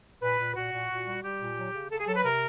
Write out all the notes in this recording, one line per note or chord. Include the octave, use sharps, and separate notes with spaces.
A#2 B4
A#2
A#2 F#4
A#2
A#2
G3
G3 G4
A#2
F#3
C#3
C#3 A4
G#4
F#3 A4
B4
C3 A#4